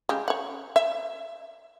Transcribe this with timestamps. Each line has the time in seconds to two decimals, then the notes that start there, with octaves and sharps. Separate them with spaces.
0.09 C#3 G#3 G4
0.28 C#5 F#5
0.76 E5